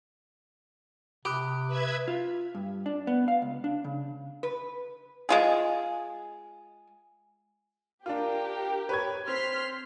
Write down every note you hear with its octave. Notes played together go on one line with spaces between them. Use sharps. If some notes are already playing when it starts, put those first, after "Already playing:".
C3 G4 B5 D#6 F#6
B4 E5 G#6
F4
G2
D4
B3
F5
C#2
D4
C#3
B4
G#3 F4 G#4
D4 F4 G4 A#4
B4 C#5 G#6
C4 C6 F6 B6